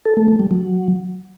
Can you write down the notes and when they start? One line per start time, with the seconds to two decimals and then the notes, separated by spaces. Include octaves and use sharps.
0.05 A4
0.17 A3
0.28 A3
0.39 G3
0.51 F#3